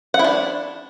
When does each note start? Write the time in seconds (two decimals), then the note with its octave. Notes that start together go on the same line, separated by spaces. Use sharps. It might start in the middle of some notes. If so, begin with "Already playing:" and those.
0.14 F#5
0.19 E4
0.24 D4